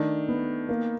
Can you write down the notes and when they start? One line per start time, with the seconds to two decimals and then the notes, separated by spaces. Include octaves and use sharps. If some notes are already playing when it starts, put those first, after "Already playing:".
Already playing: D#3 A3 D4
0.29 B3
0.69 A#3